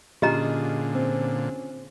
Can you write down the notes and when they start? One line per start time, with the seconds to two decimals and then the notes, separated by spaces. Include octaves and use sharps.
0.22 A#2 D3 C#4 F4 G4 G#4 D#5 A#5
0.95 C4